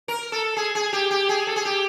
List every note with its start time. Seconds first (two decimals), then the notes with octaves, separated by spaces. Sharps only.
0.08 A#4
0.32 A4
0.57 G#4
0.75 G#4
0.93 G4
1.11 G4
1.29 G#4
1.47 A4
1.56 G#4
1.65 G4